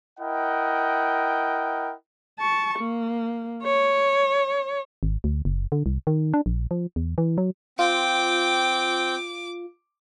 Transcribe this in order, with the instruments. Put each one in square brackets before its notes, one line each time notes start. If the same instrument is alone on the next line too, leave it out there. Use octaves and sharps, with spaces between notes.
[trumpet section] E4 A#4 D#5 F#5 G5
[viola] A5 C#6
A#3
C#5
[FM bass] G#1
D2
F#1
D3
C2
D#3
D4
A#1
F3
E2
E3
F#3
[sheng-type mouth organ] C4 G5 [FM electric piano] F4 [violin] D6